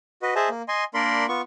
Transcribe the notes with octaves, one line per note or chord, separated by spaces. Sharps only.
F#4 B4 D#5
G#4 C5 D#5 E5 A5
A#3
D#5 G#5 C6
A#3 D4 A#4 D5 B5 C6
B3 F4 C#6